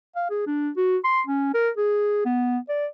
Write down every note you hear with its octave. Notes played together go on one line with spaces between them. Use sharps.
F5
G#4
D4
F#4
C6
C#4
A#4
G#4
B3
D5